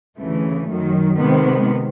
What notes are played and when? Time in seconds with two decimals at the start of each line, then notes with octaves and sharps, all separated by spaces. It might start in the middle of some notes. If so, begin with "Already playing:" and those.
0.19 D2 C#3 E3 A3
0.68 F#2 D#3 F#3
1.18 C3 D#3 G#3 B3